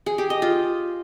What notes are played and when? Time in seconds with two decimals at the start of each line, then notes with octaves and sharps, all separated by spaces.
0.06 G#4
0.18 G4
0.30 D#5
0.42 F4